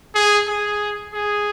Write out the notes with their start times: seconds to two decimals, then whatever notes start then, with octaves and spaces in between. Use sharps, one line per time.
0.15 G#4
0.47 G#4
1.14 G#4